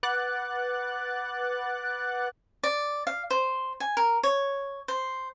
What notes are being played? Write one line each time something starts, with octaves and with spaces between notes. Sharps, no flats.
B4 F#5 D6 F#6 A6
D5
F5
C5
G#5
A#4
C#5
C5